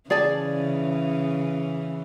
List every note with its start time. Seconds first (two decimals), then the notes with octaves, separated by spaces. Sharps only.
0.10 C#3 E3 G#4 D5 A5